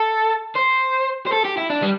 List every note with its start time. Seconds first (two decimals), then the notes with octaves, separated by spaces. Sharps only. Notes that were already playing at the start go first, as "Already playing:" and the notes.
Already playing: A4
0.55 C5
1.26 C5
1.32 A4
1.45 G4
1.57 E4
1.70 D4
1.82 G3